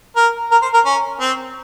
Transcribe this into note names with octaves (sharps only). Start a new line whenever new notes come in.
A#4
A#4
C5
A#4
C#4
C4